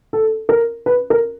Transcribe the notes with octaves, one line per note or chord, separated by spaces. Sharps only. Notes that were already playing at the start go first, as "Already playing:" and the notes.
A4
A#4
B4
A#4